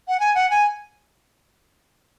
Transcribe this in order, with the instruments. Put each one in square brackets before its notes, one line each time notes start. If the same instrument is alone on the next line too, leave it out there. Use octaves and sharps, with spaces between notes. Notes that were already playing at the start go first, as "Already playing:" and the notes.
[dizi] F#5
G#5
F#5
G#5